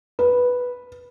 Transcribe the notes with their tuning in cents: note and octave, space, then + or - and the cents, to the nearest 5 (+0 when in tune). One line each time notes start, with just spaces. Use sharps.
B4 -5